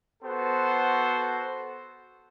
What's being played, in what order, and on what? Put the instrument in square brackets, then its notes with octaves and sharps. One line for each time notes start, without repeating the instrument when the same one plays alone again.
[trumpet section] B3 F#4 A4 C5